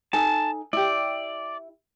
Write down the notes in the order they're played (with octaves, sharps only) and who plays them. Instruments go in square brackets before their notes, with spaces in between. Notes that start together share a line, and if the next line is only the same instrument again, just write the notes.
[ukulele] D#4 A4 G#5 [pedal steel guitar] A5
[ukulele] E4 G4 [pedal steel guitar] D5